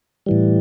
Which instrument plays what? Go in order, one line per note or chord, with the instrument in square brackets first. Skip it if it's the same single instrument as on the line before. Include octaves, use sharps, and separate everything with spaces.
[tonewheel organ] A2 E3 G3